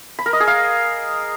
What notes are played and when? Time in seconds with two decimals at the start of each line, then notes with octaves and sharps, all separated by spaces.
0.19 B5
0.26 A#4
0.33 D#5
0.40 G#4
0.47 F5